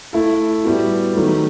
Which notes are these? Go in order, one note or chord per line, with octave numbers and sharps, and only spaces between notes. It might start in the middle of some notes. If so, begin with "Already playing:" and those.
A3 E4 A4
A2 G3 B3 F#4
D#3 F#3 A3